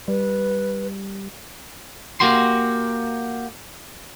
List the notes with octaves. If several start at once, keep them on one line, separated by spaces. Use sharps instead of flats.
G3 B4
A#3 F#4 G4 C6